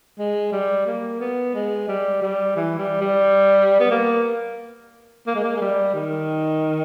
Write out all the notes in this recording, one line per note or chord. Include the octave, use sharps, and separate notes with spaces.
G#3
G3
A#3
B3
G#3
G3
G3
E3
G3
G3
B3
A#3
A#3
G#3
A#3
G#3
G3
D#3